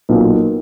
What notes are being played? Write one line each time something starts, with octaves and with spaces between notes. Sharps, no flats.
B1 A#2 A#3